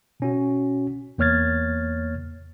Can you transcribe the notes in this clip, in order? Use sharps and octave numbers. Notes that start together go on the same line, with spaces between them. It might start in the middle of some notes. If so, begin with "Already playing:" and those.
B2 C#4 F#4
E2 A#3 C#5 F6 G#6 A6